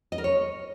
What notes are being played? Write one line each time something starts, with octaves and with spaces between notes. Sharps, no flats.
D#5
A#4
C#5